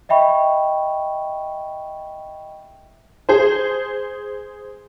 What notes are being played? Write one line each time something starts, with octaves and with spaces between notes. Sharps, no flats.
D#5 E5 G5 B5 C#6
G#4 C5